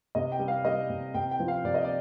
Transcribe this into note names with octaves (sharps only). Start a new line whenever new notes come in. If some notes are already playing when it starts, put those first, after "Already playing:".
C3 D#5
G5
G3
F5
G3 D#5
C3
C3 G5
G5
F3
F5
C3 D5
D#5
D5